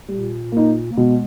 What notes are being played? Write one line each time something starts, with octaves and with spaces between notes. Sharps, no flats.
A#2 G3
A#3 D#4
A#3
B2 G#3